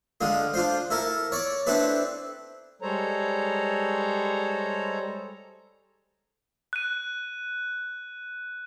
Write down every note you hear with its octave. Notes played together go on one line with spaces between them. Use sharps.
D3 G#3 F4
D4 F4 C5
E4 A4 A#4
C#5 D5
C4 D4 E4 A4 B4
G3 G#3 A4 C5 C#5 A#5
F#6 D#7